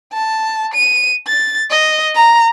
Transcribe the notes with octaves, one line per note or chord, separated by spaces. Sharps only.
A5
D#7
A6
D#5
A#5